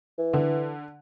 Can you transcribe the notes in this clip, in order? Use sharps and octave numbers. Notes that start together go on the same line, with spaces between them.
E3
D3